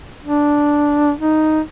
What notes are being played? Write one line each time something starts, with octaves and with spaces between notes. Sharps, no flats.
D4
D#4